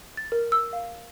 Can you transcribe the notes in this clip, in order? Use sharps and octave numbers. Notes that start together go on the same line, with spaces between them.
A6
A#4
E6
F5